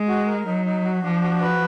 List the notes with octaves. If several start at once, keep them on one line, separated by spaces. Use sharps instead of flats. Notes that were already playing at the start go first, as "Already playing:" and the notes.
Already playing: G#3
F#4
A#4
F#3 D#4
D#4
F#4
F3 D4
F#4
B4